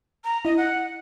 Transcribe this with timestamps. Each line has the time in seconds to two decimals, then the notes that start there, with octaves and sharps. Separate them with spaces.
0.24 A#5
0.45 E4 D#5
0.57 F#5